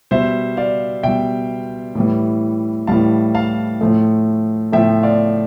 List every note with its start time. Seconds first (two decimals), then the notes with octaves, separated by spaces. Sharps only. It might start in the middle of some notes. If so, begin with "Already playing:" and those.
0.11 B2 G3 C5 E5
0.57 D5 F5
1.03 B2 G3 E5 G5
1.95 A2 E3 G3
2.87 A2 E3 G3 F5 A5
3.35 F5 A5
3.81 A2 F3 A3
4.72 A2 F3 A3 E5 G5
5.03 D5 F5